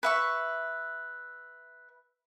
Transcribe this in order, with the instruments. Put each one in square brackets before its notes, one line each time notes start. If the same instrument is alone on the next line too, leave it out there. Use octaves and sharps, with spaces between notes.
[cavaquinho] B4 E5 C#6